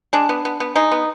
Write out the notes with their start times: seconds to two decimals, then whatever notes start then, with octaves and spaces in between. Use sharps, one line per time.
0.13 G#3 D4
0.29 B3
0.45 B3
0.60 B3
0.76 G#3 D#4
0.92 B3